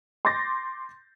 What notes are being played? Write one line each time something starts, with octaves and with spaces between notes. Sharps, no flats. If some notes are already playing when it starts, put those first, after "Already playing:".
C6 D6 G6 A6 A#6